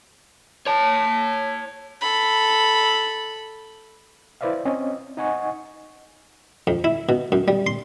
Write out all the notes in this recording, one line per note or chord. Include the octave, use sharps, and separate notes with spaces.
C#5 A5
A4 B5
E4 B4 C5 D5 E5 F5
C4 C#4 D#5
D#4 D#5 F#5 G#5 C#6
F2
E4
B2
F#2
G3
C6